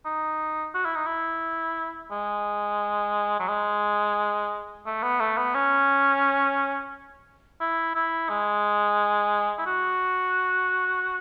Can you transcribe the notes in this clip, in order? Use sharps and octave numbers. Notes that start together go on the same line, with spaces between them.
D#4
F#4
E4
D#4
E4
G#3
F#3
G#3
A3
B3
A3
B3
C#4
E4
E4
G#3
E4
F#4